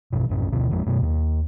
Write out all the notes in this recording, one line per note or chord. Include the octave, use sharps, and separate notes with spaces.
A#1 G2 B2
A#1 F#2 A2 C#4
D2 B2 D3
A1 F2 G#3
F#2 B2
D#2